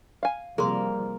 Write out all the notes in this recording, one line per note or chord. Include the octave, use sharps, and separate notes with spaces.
F5 G#5
C3 F3 G3 A#3 G#4 A#4 C6